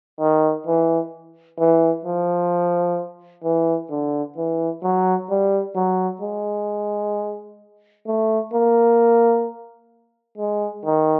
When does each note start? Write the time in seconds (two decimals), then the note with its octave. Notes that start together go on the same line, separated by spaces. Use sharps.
0.20 D#3
0.67 E3
1.59 E3
2.05 F3
3.44 E3
3.90 D3
4.37 E3
4.83 F#3
5.30 G3
5.75 F#3
6.22 G#3
8.07 A3
8.53 A#3
10.38 G#3
10.85 D#3